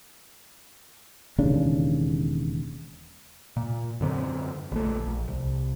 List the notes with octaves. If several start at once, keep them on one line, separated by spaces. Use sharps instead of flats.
E1 D#2 C#3 D4
A#2
F#2 D3 C4
A#1 A3
A#1
C2